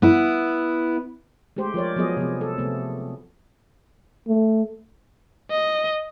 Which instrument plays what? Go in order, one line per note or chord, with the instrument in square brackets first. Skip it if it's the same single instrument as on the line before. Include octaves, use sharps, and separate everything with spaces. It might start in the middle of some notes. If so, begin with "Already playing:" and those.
[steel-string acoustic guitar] B3 E4
[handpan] G#3 A3 G4 C5
F3 A#4 C#5 D5
F3 F#3 B3 G#4 D#5
C3 F3 B3
A4
C3 A3 B3
[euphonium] A3
[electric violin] D#5